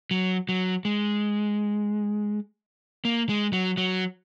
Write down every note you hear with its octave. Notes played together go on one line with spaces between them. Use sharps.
F#3
F#3
G#3
A#3
G#3
F#3
F#3